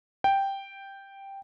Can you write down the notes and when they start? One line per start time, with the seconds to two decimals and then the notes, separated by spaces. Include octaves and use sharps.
0.24 G5